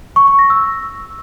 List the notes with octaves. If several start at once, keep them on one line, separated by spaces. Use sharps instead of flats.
C#6
C#6
A#6
E6